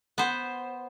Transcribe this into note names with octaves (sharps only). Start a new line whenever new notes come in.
B3 C5